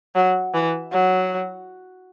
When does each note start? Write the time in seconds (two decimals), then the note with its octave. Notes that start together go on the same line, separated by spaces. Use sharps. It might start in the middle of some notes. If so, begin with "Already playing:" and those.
0.15 F#3
0.54 E3
0.92 F#3